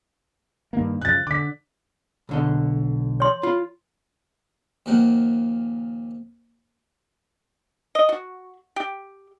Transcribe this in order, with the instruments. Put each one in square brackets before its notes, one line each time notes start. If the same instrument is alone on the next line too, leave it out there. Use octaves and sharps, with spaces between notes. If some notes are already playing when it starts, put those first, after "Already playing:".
[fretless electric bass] G2 D#3 A#3
[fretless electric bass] F#2 C#3 F3 [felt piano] F#6 A6
[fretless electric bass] D3 [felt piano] D6 B6
[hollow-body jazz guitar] B1 D3 D#5
[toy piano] C#5 C6
[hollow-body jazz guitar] F4 B5
[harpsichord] D#2 A#2 F3 A#4 F#5 G5
[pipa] D#5
F#4
G4